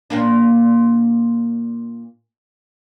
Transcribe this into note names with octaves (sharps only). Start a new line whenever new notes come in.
A#2 A#3 D4